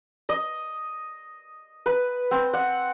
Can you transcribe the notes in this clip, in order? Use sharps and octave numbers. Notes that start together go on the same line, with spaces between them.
D#5
B4
C4
F#5